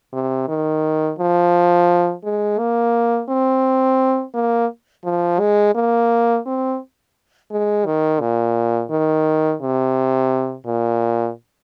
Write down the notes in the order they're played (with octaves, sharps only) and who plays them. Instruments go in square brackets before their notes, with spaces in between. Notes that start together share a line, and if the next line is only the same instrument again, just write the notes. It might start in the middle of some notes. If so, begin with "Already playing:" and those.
[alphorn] C3
D#3
F3
G#3
A#3
C4
A#3
F3
G#3
A#3
C4
G#3
D#3
A#2
D#3
C3
A#2